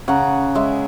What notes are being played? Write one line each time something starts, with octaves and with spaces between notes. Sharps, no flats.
C#3 F#5 A#5
G#3 C#5 E5